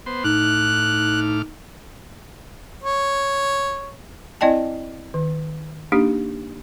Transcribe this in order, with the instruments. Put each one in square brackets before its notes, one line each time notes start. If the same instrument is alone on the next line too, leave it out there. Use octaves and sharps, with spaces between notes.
[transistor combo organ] B3 C5 C6
[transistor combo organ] A2 D6 F6 [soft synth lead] D#4 [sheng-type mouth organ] F#6
[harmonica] C#5
[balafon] C4 E4 D5 D#5 G5 A5
D#3
A#3 D4 D#4 G4